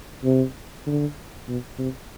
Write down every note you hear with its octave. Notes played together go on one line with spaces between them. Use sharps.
C3
D3
B2
C3